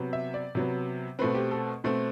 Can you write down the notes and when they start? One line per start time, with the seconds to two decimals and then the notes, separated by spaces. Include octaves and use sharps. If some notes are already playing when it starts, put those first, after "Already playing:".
Already playing: C3 F#3 B3
0.13 E5
0.34 D5
0.55 C3 F#3 B3
1.19 B2 A3 C4 B4
1.35 G4
1.51 A4
1.84 B2 A3 C4